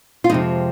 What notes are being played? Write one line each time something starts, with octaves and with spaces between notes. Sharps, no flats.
F4
F2 C3 F3 G#3 D#4